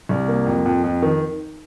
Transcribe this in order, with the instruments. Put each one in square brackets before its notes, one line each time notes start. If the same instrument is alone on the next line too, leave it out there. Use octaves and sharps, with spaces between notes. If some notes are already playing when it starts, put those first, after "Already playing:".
[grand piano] C2
A#3
F2
F2
F2
D#3